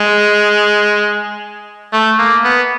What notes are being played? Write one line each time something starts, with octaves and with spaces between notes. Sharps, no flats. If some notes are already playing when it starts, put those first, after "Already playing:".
Already playing: G#3
A3
A#3
B3